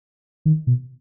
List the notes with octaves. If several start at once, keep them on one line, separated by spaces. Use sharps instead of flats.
D#3
B2